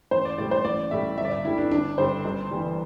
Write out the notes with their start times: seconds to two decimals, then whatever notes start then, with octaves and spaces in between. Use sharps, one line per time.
0.11 A1 C5
0.25 D5
0.38 A2 G3 D5
0.51 C5
0.65 A1 D5
0.91 A2 G3 E5
1.18 G1 E5
1.25 D5
1.32 E5
1.44 G2 D3 G3 E4
1.58 D4
1.71 G1 D4
1.98 G2 D3 G3 C5
2.25 G1
2.51 G2 E3 G3